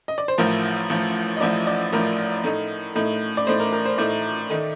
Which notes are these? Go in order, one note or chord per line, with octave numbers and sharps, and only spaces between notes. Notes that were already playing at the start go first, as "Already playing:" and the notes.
D#5
D5
C5
A1 A2 F3 A#4
A1 A2 F3
D#5
A1 A2 F3 D5
D5
A1 A2 F3 A#4
A2 A3 D#4
A2 A3 D#4
D5
A2 A3 D#4 C5
A#4
A#4
C5
A2 A3 D#4 D5
D#3 A3 D#4